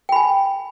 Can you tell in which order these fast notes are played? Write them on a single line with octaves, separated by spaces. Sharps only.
G5 B5 G#5